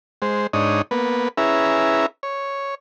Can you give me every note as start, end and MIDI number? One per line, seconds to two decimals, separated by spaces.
0.22 0.47 56
0.22 0.47 72
0.53 0.82 44
0.53 0.82 62
0.53 0.82 63
0.53 0.82 73
0.53 0.82 87
0.91 1.28 58
0.91 1.28 59
0.91 1.28 71
1.37 2.06 61
1.37 2.06 64
1.37 2.06 68
1.37 2.06 71
1.37 2.06 76
1.37 2.06 82
2.23 2.75 73